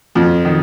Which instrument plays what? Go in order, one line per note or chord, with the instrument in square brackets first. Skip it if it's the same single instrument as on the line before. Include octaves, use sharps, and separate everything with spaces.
[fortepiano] F2 F3
D#3